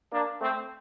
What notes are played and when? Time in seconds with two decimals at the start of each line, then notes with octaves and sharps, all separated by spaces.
0.12 A#3 D4
0.40 A3 C4